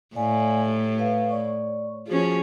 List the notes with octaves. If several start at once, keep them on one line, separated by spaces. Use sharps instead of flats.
A2 D5 F5 G#5
G4
B4 F5
C#5 D5 C#6
F3 C#4 F#4 G#4